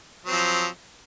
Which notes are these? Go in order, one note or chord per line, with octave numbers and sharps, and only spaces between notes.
F3 F#3 C4